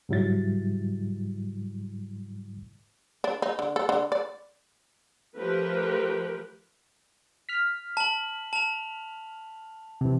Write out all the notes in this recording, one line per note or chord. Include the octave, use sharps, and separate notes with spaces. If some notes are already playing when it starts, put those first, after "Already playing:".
G#2 C#3 F#3 G3 E4 A6
D4
D#4
D3
A4
D3
D5
F3 A3 G4 A#4 B4
F6 B6
A5 F#7
A5 F7
C3 E3